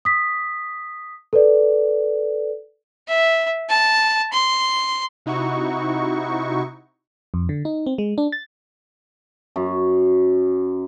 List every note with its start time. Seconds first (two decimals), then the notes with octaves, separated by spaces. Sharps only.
0.05 D#6 B6
1.33 A4 B4 D5
3.08 E5
3.69 A5
4.32 C6
5.26 C3 D#4 E4 F#4 C#6
7.34 F2
7.49 D3
7.65 D#4
7.86 C4
7.98 G#3
8.18 D4
8.32 A6
9.56 F#2